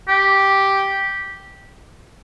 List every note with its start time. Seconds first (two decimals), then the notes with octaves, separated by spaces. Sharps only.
0.09 G4